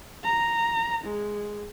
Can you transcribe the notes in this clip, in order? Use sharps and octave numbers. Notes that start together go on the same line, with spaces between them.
A#5
G#3